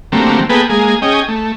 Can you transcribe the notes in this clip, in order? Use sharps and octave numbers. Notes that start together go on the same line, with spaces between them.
D3 F#3 G3 A3 A#3 C4
A#3 B3 G#4 A4 B4 G5
G#3 A#3 G#4
C#4 G#4 D#5 G5
A3